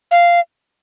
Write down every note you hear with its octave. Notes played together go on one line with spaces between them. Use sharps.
F5